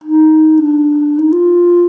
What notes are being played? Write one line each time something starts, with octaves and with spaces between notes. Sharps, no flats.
D#4
D4
D#4
F4